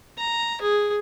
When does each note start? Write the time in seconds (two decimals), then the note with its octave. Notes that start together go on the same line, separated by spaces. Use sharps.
0.18 A#5
0.61 G#4